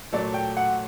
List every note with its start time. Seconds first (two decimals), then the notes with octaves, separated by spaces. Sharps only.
0.13 A#2 F#3 A3 D5
0.34 G5
0.57 F#5